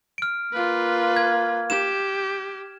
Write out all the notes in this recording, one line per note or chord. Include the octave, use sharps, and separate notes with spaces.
F6 D7
A#3 F4 B4
G#6
G4 E7